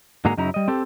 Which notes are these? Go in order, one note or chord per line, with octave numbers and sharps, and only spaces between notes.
G#2 D3 A#3 F#4 G#4 A#5
F#2 C#3 F#3 D#4 E4 A#5
G3 D#5
C4 G4 A4